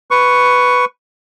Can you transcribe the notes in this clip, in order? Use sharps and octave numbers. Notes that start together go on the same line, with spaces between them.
B4 C#6